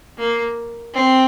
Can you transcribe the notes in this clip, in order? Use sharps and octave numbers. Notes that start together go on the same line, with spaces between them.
A#3
C4